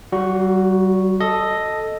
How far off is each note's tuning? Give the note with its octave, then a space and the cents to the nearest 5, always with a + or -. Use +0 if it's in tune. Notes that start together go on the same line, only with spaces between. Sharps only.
G3 -40 F#4 +0
A4 +0 D#5 +0